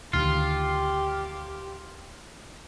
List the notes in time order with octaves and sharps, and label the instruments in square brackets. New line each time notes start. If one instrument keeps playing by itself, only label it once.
[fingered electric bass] D2 D#3 [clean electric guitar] F4 [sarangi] G4